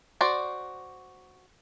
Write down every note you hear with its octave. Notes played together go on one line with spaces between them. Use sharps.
F#4 C5 D5